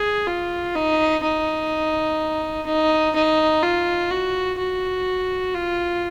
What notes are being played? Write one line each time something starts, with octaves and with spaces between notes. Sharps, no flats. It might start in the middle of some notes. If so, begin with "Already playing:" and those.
Already playing: G#4
F4
D#4
D#4
D#4
D#4
F4
F#4
F#4
F4